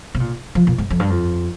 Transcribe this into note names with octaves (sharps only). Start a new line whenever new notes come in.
C3
A#2
F3
A#2
G#2
F2
G2
F2